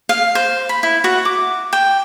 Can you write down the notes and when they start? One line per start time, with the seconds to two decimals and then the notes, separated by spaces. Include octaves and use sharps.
0.09 F5
0.35 C5
0.69 B5
0.83 E4
1.04 F#4
1.25 D6
1.73 G5